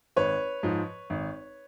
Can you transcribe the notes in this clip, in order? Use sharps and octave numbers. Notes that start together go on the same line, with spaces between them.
G#1 B4 C#5
G#2 F3
G#1